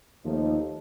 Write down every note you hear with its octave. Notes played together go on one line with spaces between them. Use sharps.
D#2 F3 A3 D#4